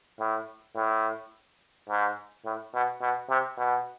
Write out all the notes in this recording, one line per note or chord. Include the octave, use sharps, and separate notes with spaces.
A2
A2
G#2
A2
B2
B2
C3
B2